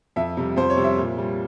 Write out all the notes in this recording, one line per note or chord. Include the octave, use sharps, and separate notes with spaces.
F2 E5
C3 G3
F2 C5
C#5
C3 G3
E5
A#2
G3